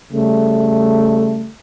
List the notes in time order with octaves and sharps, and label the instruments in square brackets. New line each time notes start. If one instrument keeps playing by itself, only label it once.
[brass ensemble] C#3 G3 A3